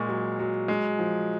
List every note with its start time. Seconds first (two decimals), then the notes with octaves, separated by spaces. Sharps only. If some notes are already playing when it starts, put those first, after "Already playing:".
Already playing: A#2 G#3 C#6
0.09 F#3
0.39 F#3
0.68 G#3
0.99 F3